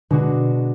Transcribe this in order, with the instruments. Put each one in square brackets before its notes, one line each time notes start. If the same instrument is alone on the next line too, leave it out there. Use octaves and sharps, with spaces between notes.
[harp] B2 G#3 D4 F#4 [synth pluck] D3